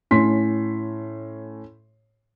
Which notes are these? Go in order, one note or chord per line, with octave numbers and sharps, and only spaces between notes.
A2 C#4 C6 B6